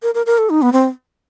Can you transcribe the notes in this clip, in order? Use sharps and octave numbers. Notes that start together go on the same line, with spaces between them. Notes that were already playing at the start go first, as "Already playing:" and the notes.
A#4
A#4
A#4
A4
D#4
B3
C4